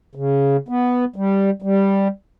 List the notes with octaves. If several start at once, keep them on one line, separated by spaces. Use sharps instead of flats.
C#3
B3
G3
G3